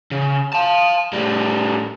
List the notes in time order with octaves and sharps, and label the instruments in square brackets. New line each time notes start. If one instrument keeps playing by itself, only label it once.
[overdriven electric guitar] C#3
F5 A5
A2 G3